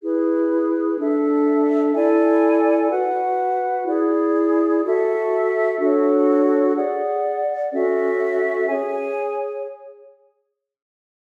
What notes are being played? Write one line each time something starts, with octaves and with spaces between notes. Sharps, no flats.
E4 G#4 B4
D4 A4 E5
E4 A4 D5 G#5
F#4 B4 F#5
E4 G#4 D5
F#4 A4 E5
D4 F#4 A4 C#5
G#4 D5 F#5
C#4 F#4 A4 E5
G#4 C#5 G#5